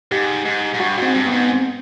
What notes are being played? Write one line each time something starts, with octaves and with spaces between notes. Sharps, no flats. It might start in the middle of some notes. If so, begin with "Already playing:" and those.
G#2 G4
G#2
G#2
G2 F#4
G#2 C4
G2
B3
G#2
B3
C4